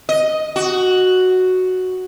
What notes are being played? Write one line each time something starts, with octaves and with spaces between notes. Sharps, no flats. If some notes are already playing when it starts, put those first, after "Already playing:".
D#5
F#4